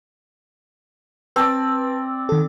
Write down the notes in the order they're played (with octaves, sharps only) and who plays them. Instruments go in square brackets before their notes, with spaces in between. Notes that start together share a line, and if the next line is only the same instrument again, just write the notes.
[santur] C4 D5 [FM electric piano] B4 A5
[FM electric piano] D#3 A4